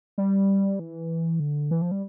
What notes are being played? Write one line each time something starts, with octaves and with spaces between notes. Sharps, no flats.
G3
E3
D3
E3
F3
G3